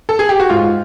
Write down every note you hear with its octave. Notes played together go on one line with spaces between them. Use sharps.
A4
G#4
G4
F#4
G#2 F4